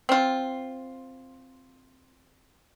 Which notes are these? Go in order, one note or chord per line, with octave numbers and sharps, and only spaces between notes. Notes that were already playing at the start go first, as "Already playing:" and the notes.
C4 F4